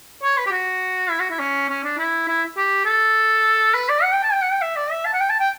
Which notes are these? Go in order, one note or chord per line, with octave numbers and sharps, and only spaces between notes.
C#5
B4
G4
F#4
E4
F#4
E4
C#4
C#4
D4
E4
E4
G4
A4
B4
D5
F#5
G5
A5
G5
F#5
G5
E5
D5
E5
A5
F#5
G5
A5
G5